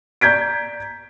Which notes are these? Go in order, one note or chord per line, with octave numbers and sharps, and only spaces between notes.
D5 A#5 G6 G#6 B6 D7